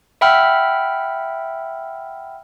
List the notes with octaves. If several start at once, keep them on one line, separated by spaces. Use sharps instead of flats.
E5 F#5 G5 B5 E6 F6